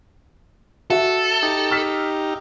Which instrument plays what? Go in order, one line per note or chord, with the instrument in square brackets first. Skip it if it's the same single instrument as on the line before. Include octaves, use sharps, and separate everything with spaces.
[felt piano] F#4 E5 [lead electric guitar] A4
[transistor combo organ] D#4 G4
[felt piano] E6 F6 B6